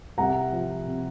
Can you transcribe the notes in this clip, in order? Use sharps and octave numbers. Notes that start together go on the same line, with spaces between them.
C2 F#5 A#5
F3
C3